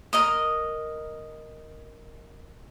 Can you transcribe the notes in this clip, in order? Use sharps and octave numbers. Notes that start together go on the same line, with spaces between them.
A#4 D#5 D#6